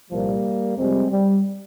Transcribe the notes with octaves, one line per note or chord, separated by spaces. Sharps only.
C2 A#2 F3 G3 A#3
F2 C3 G3 G#3 C4
G3